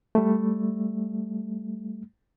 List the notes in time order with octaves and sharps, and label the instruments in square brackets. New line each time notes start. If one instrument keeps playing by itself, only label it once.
[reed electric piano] G3 A3